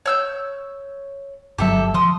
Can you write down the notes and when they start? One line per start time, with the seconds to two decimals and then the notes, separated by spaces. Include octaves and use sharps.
0.06 C#5 E6 G6
1.58 G1 F#3 G4 A4 E5
1.94 F3 C6 D#6